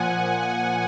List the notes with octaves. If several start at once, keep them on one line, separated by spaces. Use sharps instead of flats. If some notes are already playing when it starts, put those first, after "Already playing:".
Already playing: A#2 F3 F#5 G#5
A#2 F3